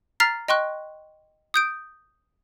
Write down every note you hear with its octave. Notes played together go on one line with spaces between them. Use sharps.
A#5 F6 A6 B6 C7
D#5 G5 C6 C#6 F#6
D#6 G6 D7